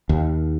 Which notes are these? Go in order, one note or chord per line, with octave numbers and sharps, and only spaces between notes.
D#2